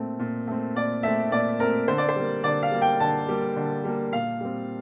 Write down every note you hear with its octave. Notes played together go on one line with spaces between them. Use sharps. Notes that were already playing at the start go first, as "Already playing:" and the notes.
Already playing: A#2 A3 C4
A#2
A3 C4
A#2 D5
A3 C4 E5
A#2 D5
A3 C4 A#4
D3 C5
D5
C5
G3 A#3
D3 D5
F5
G3 A#3
G5
D3 A5
G3 A#3
D3
G3 A#3
A#2 F5
G3 C4